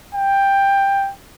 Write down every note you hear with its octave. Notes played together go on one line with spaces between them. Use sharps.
G5